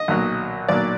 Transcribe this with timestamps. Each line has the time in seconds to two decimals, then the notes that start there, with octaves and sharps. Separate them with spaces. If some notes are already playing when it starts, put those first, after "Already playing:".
Already playing: D#5
0.08 B1 A#2 F#3
0.68 B1 A#2 F#3 D5